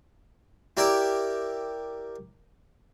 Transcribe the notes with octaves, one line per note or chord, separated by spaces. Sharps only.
E4 G4 A#4 D5 E5